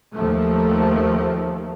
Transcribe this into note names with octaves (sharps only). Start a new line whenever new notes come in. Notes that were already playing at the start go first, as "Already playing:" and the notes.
D#2 F3 A3